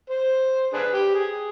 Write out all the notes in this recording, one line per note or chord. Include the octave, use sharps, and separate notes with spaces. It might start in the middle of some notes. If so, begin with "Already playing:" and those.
C5
D4 G#4 B4
G4
G#4